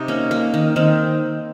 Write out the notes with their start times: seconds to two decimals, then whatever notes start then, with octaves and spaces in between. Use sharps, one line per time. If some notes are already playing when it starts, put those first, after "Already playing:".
Already playing: C3 D#4
0.08 A#3 C#4
0.31 A#3
0.54 D#3
0.76 D#3 C4